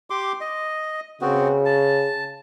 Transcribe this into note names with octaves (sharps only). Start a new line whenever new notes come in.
G4 C6 D6
D#5
C#3 B3 C4 F#4
A5